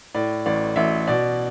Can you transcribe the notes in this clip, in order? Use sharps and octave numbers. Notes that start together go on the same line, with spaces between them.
A2 D5
A1 D5
A1 E5
B2 D5